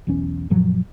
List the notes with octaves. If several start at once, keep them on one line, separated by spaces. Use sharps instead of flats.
B1 E2 C#4
F#2 A#2 F3 F#3